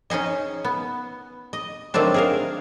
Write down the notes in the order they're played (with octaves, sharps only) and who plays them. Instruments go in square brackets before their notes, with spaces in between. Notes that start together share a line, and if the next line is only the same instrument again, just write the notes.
[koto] C#4 D#4 G#4 D#5
B3
D#5
D#3 F#3 A3 C4 D4
G#4 A#4 F5